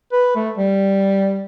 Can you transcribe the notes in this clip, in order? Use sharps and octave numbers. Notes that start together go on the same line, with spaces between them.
B4
A3
G3